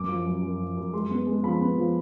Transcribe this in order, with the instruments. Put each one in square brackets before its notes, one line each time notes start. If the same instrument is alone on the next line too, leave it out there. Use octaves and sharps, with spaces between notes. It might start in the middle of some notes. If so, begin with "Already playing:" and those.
Already playing: [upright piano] F#2 D6
F3
F#2
F#2
F3
F#2
G#3 C6
B3
G#3
F3 B5
B3
F3